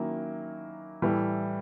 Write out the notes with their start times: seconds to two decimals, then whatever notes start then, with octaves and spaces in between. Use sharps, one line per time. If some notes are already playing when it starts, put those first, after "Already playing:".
Already playing: D#3 F#3 A#3 C#4 E4
1.02 A2 E3 G3